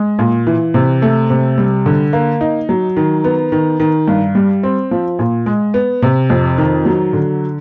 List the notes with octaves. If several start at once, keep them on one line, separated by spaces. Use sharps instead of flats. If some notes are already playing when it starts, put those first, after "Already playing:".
Already playing: G#3
A#2
E3
C3
A3
C3
G3
D3
A#3
D#4
F#3
D#3
B3
D#3
D#3
G2
G3
C4
F3
A#2
G#3
B3
C3
F2
D#3
F#3
D3